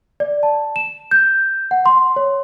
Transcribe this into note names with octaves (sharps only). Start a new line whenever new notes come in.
D5
A5
E7
G6
F#5
C6
C#5